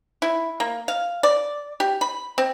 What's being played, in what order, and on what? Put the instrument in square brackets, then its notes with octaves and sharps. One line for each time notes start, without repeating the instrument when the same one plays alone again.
[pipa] E4
A#3
F5
D5
G4
B5
C4